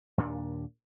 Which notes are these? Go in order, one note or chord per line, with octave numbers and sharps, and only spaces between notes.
D#2 A#2 D4